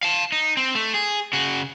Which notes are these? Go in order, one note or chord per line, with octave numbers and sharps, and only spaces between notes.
F5 A5
D#4
C4
A3
G#4
C#3 F#4